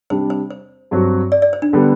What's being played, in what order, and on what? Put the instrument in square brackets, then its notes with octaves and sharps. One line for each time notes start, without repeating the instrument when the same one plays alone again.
[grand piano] C3 G3 D4 [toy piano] C5
[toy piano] C5
C5
[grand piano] G2 F#3 C4 F#4
[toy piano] D5
D5
C5
D4
[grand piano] D3 G3 B3